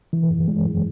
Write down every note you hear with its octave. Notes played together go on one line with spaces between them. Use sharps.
E3
F#2
G#3
F#2